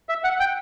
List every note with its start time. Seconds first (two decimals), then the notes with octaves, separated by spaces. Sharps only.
0.09 E5
0.24 F#5
0.40 G5